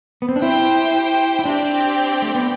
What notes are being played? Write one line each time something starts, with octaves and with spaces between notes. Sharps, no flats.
B3
C4
D4
E4 G4 C5 G5
E4
C4 D4 G4 D5 G5
A3
B3